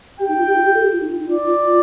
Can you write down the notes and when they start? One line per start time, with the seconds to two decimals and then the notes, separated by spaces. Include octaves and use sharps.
0.19 G4 G5
0.28 D#4
0.38 F4
0.47 G4
0.56 F4
0.65 G4
0.75 A4
0.83 G4
0.92 F4
1.01 D#4
1.11 F4
1.19 D#4
1.29 F4 D5
1.47 F4
1.65 F4